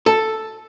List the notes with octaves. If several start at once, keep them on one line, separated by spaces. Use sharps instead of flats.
A4